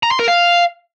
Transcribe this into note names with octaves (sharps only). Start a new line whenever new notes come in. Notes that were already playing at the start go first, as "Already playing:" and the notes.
A#5
C6
A#4
F5